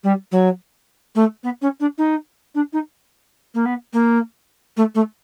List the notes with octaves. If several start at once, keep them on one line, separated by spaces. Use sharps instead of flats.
G3
F#3
A3
B3
C#4
D4
D#4
D4
D#4
A#3
B3
A#3
A3
A3